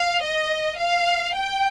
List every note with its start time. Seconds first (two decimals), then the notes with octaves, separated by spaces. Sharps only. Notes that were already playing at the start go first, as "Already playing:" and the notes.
Already playing: F5
0.23 D#5
0.79 F5
1.36 G5